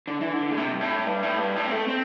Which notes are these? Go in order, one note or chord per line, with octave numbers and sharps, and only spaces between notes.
D3
E3
D3
A2
C3
G2
A2
G2
A2
G2
A2
C4
A3
C4